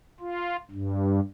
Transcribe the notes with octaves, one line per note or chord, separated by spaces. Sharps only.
F4
G2